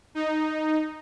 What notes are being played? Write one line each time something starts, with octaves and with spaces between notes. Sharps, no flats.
D#4